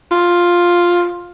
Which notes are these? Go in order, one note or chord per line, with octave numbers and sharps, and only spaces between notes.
F4